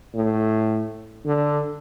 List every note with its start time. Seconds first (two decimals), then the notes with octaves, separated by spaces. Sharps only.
0.14 A2
1.25 D3